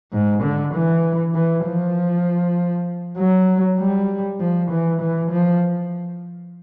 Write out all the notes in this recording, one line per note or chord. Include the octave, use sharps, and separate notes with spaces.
G#2
D3
E3
E3
F3
F#3
G3
F3
E3
E3
F3